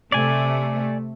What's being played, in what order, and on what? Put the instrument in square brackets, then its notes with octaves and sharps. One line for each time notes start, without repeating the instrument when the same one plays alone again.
[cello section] C3 A3 [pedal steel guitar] D5 G#5